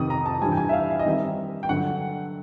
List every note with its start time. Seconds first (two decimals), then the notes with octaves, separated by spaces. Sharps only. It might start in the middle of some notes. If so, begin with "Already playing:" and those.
Already playing: F2 C3 D#3 D#6
0.10 A#5
0.26 A5
0.42 G2 E3 G3 G#5
0.52 G5
0.57 G#5
0.69 E5
0.73 F5
0.90 E5
0.99 D#5
1.06 D#3 G3 C4 D#4 E5
1.63 G5
1.69 G2 D3 F#3 F#5